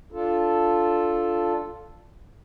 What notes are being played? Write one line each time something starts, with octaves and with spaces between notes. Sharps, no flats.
D4 F4 A4